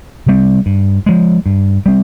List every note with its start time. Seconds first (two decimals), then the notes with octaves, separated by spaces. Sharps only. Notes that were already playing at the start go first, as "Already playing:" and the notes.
0.26 C3 G3 C4
0.66 G2
1.06 F3 G#3
1.46 G2
1.86 G3 C4